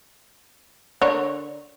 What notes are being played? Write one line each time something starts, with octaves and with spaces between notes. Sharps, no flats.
D3 A#4 C#5